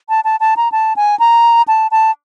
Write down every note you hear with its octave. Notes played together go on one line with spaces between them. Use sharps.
A5
A5
A5
A#5
A5
G#5
A#5
A5
A5